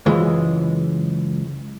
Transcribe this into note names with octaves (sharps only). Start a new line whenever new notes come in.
C#2 F#2 E3 G#3